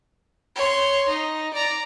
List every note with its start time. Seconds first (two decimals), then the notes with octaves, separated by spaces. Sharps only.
0.55 C#5 C6
1.08 D#4
1.54 D5 A#5